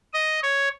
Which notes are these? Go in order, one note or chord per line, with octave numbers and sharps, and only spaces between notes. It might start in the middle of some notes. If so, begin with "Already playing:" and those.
D#5
C#5